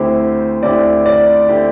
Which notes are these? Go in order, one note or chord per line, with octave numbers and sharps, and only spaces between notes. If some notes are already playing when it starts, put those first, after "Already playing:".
Already playing: D2 D3 C4 E4 G4 C5
D2 D3 C4 E4 G4 D5
D5
D3 C4 E4 G4